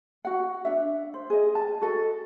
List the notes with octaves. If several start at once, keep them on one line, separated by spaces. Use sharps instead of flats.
F#4 F#5
D4 E5
C5
G#4 D#5
A5
F#4 A4 D#5